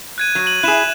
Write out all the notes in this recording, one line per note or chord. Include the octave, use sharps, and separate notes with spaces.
F#6 G#6 D#7
F#3
D#7 F#7
E4 G#4 F#6 E7